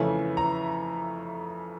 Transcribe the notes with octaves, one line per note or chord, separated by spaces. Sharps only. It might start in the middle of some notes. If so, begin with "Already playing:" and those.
Already playing: F2 C#3 E3 A3 G#5
A#5